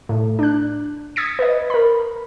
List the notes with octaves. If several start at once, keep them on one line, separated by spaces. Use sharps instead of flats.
A2
D4 F#6
D#6 G#6 A6 B6 C#7
B4 D#5
A#4 B5